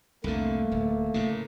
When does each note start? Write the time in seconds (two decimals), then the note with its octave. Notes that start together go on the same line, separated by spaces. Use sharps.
0.24 C2 F2 D3 A3 A#3
0.71 D1
1.14 A2 C#3